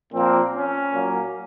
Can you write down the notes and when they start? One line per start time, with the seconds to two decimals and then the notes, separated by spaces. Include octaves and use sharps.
0.12 A#2 F3 A#3 C4
0.53 C#4
0.93 A#2 F#3 A#3